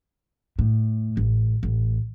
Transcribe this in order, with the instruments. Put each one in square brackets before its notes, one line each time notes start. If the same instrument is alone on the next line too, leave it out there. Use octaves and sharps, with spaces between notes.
[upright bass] A2
A1
A1